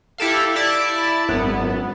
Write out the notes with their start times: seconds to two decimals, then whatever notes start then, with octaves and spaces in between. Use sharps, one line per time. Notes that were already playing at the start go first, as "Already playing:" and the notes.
0.18 E4 G4 A4 F5
0.56 E4 D5 A5
1.29 G#1 F#2 B3